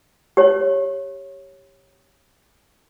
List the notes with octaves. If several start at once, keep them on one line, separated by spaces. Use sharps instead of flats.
G4 C#5